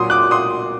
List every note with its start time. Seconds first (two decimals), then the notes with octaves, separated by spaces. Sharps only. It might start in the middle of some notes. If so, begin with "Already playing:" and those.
Already playing: A#2 F#3 C6 D#6
0.10 D6 F#6
0.31 C6 D#6